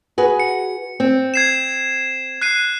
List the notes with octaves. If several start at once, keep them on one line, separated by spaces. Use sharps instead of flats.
F#4 G#4 B4
C#7
C4
G#6 C7 E7
F#6 C7 D#7